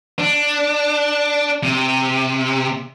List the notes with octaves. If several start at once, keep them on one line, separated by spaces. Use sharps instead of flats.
D4
C3